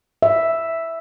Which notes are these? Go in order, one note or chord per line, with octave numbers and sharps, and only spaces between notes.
E5